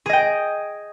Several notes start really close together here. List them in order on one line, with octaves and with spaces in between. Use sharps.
G#4 D#5 G5